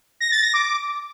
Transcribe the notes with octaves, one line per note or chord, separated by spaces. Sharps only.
A#6
A6
A#6
D6